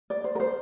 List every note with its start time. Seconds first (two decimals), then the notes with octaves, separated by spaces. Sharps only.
0.10 D5
0.24 C5
0.35 A#4
0.40 C5